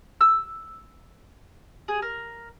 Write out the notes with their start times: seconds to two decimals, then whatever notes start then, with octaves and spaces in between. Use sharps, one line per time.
0.21 E6
1.88 G#4
2.02 A#4